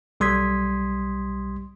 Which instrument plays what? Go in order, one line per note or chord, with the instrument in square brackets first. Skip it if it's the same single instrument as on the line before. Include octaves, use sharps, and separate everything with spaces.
[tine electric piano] B1 G3 C6 D#6 G#6 B6